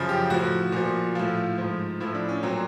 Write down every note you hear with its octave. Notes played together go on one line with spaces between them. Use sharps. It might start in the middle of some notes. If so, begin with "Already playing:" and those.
Already playing: F#2 C#3 F3
G4
A2 F3 F#4
A#2 F3
A2 F3 F4
G#2 F3
A2 F3 E4
D4
C#4
A#2 F#3 C4